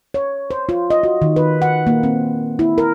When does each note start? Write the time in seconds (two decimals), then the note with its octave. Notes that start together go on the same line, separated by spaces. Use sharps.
0.14 C#5
0.51 C5
0.69 F4
0.90 D#5
1.03 F#4
1.22 D#3
1.36 B4
1.62 F#5
1.87 A#3
2.03 C4
2.59 E4
2.78 A#4